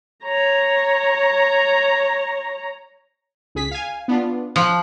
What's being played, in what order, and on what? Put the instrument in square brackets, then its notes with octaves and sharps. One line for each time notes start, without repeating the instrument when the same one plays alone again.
[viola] C#5 A#5
[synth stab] C#2 G#4 B6
F5 G#5
B3 D4 F4
[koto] F3 [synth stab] F#6